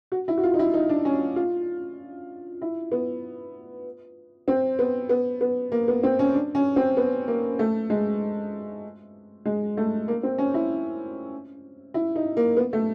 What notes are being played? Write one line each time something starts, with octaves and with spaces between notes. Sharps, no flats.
F#4
E4
F#4
F4
D#4
E4
D#4
D4
C#4
F4
E4
B3
C4
B3
B3
B3
A#3
B3
C4
C#4
D4
C#4
C4
B3
A#3
A3
G#3
G#3
A3
A#3
C4
C#4
E4
E4
D#4
A#3
B3
A3